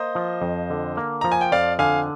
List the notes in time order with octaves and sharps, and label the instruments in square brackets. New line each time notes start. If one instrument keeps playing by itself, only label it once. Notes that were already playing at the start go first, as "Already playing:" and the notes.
Already playing: [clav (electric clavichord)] A#3 [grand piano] C5 D#5
[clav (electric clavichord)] F3
F2
D3
A#3
[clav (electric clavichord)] F3 [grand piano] A#5
[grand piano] G#5
G5
[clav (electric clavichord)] F2 [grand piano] D5 F5
[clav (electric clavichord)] D3 [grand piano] F5 G#5